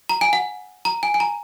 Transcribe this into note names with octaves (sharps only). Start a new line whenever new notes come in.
A#5
G#5
F#5
A#5
G#5
G#5
A#5